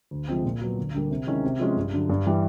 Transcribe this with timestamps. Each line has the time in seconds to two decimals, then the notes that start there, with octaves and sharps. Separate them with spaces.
0.11 D2
0.28 C3 F3 G#3 C4
0.44 A#2
0.61 F#3 B3
0.78 D2
0.94 D3 G3 A#3
1.11 C3
1.27 D#3 G#3 C#4 E4
1.44 C3
1.59 F3 G#3 C#4 F4
1.76 G2
1.93 D3 F#3
2.09 G2
2.26 E3 G3